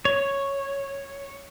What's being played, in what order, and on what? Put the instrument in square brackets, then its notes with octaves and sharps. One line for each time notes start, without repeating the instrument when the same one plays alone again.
[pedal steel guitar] C#5